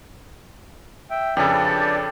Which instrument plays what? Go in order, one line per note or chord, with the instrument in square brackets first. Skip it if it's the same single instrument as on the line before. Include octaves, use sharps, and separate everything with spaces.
[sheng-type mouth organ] E5 G5
[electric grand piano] F2 C#3 [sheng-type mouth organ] D4 B4 D5 [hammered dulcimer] G4 A4